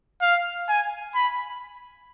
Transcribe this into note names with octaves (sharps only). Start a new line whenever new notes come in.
F5
G#5
B5